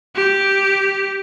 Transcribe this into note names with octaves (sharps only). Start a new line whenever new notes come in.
G4